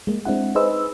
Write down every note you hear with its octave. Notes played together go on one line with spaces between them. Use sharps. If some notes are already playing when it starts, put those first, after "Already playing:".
G#3 A#3
G#3 C4 D4 E4 F#5
D#4 G#4 B4 C5 D#5 E6